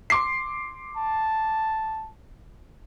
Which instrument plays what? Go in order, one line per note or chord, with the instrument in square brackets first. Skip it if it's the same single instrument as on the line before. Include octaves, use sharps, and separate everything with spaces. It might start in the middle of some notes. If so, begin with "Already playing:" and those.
[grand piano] C6 D6 C7
[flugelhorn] A5